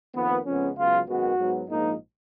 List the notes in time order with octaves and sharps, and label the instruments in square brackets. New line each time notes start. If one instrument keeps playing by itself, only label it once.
[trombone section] F2 D#3 A#3 B3
F2 C#3 G#3 B3 C#4
C#2 C#3 F#3 B3 F4
G#1 F#2 D#3 G#3 B3 F#4
G#2 F#3 B3
A#1 G#2 F3 A#3 D#4